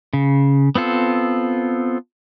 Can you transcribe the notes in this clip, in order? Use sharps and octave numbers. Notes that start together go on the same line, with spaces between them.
C#3
B3 C4 F4 A4